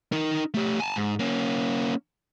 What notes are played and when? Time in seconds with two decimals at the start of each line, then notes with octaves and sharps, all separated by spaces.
0.12 D#4 A#4
0.54 A3 G4
0.80 G#5 A5
0.96 G#2
1.19 A#3 C#4